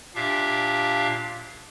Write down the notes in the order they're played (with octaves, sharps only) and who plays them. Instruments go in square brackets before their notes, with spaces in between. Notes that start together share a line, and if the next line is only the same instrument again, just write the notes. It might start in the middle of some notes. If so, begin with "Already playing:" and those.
[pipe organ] A#2 D4 G4 E5 F5